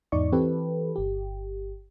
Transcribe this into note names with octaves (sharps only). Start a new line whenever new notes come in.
E2 G#2 D#4 D5 C#6
E3 C4 G4 A4 B4
G1 G4